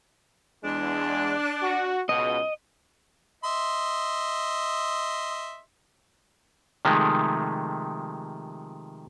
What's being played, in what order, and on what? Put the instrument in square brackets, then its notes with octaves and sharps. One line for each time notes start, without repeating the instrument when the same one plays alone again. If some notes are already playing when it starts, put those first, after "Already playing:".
[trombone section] E2 G#3 [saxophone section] D4
[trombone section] F#4
[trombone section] C#2 B2 [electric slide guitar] D#5
[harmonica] D#5 E5 C6
[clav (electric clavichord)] C3 D#3 F3 G#3 A3